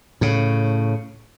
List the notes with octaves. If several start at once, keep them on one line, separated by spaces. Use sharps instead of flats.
A2 C#3